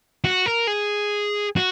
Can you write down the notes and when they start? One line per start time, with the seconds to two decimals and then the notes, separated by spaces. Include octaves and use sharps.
0.24 F#4
0.46 A#4
0.67 G#4
1.56 F#4